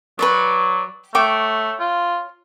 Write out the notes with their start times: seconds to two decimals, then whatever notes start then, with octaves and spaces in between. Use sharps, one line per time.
0.19 F#3 B4 C#5 D5
1.15 A3 C#5 G5 D6
1.80 F4